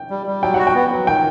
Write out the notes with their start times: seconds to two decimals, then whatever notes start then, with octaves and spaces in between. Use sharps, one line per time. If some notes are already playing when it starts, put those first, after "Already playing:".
Already playing: G5
0.10 G3
0.26 G3
0.42 F#3 G5
0.54 F#4 F#5
0.67 G5
0.75 B3
0.92 F#3
1.07 D#3 G5